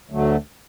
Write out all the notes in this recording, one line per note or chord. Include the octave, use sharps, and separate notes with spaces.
D2 D3 F#3 A3